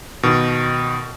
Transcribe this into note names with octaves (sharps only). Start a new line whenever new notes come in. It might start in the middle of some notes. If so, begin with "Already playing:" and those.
B2 D#3